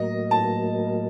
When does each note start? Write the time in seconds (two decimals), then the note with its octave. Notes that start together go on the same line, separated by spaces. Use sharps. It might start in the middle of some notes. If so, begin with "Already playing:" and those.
Already playing: A2 F#3 A#3 D#5
0.31 A5